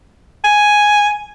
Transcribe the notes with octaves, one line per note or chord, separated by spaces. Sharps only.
G#5